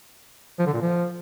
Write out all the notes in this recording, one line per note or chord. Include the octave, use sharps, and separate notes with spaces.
F3
D3
A#2
F3